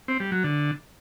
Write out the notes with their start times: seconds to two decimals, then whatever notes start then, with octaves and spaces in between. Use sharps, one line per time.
0.08 C4
0.20 G3
0.32 F#3
0.44 D3